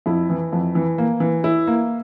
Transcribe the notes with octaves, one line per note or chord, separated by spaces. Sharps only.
F2 E4
E3
F2
E3
A#3
E3
E4
A#3